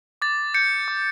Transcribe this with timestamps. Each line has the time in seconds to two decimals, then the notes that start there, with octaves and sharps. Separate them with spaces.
0.22 D6 A6
0.54 G6 C#7
0.88 D6